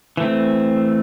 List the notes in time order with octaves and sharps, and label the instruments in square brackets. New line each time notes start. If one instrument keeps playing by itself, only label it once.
[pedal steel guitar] E3 A3 C4